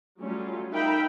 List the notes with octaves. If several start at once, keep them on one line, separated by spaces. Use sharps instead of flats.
F#3 G3 A3 C#4 F4
D#4 A#4 E5 F5 G5 B5